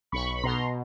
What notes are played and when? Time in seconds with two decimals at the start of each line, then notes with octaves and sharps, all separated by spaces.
0.12 B1 B5 C#6
0.35 B5
0.43 B2 A#5 C6